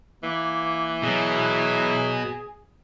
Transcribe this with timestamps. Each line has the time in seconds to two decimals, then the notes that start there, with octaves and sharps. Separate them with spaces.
0.23 E3 A#3
1.03 B2 F#3 G#4